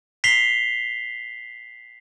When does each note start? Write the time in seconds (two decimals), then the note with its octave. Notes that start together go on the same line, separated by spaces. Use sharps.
0.24 B6 C7 F7 G7